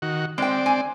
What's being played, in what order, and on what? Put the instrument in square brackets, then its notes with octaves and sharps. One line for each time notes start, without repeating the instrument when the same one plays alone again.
[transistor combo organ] D#3 F#4
[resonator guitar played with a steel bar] G#3 G5 [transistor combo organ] C4 D5
[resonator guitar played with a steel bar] G#5